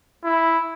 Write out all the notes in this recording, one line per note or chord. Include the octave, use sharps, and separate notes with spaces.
E4